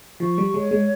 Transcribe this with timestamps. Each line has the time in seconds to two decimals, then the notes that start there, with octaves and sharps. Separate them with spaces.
0.20 F3 C#6
0.38 G3
0.54 G#3 C#5
0.71 G#3